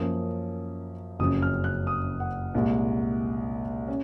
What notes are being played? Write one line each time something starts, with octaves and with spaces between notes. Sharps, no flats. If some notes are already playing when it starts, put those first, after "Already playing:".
Already playing: F#2 F3 A#3 C#4 D#6
F#1 F2 C#3 F#3 C#4 D#6
F6
F#6
D#6
F#5
C2 A#2 G#3
C#4